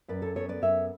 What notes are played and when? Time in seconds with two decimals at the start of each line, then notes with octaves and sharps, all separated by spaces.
0.08 F#2 B4 D5
0.22 A4 C#5
0.35 B3 A4 C#5
0.49 B4 D5
0.62 F#2 C#5 E5